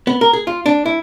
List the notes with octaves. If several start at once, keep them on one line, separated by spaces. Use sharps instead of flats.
B3
A#4
G#4
F4
D4
E4